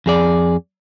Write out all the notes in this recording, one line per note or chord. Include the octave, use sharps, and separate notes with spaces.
F2 G#4 D5